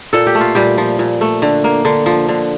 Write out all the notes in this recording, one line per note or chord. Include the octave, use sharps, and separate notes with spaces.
A#2 A4
G4
A3
F4
A#2 G3 G4
F3
A#2
A3
D3
A#3
D3
F3
D3